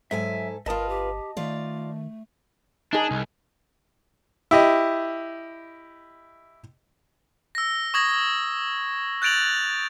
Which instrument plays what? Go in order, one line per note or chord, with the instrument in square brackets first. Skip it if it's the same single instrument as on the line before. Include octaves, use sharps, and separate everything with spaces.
[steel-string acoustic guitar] G#2 A4 G#5 [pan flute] F#3 [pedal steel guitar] E5
[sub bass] G1 [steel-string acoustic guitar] F4 B4 [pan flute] A#4 [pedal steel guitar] D#5 A5 D#6
[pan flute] G4
[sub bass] D#3 [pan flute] A3 [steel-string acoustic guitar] F4 D5
[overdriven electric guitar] D4 [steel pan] D#4 G#4
[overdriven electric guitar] C2
[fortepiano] E4 G4 D#5
[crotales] E6 A#6
C#6 D#6 G#6 A#6
F#6 G6 A6 D7 F7 F#7